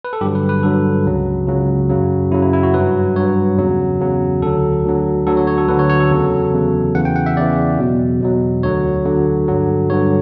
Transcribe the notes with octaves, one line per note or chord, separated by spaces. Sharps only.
B4
A4
G2 D3 F#3 G4
B4
B4
G2 D3 F#3 A4
C#2 C#3 F#3
C#2 C#3 F#3
F#2 C#3 F#3
F#2 C#3 F#3 E4
E4
E4
F#4
G2 F#3 B4
G2 F#3 C#5
E2 C#3 F#3
E2 C#3 F#3
D2 D3 F#3 A4
D2 D3 F#3
D2 D3 F#3 A4
C#5
C#5
A4
D2 D3 F#3 B4
C#5
C#5
A4
E2 C#3 F#3
E2 C#3 F#3
E2 C#3 E3 F#5
G5
F#5
E5
E2 C#3 E3 D5
E2 B2 F#3
E2 B2 F#3
D2 D3 F#3 C#5
D2 D3 F#3
G2 D3 F#3
G2 D3 F#3 C#5